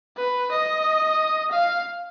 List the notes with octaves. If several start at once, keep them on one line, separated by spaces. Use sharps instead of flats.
B4
D#5
F5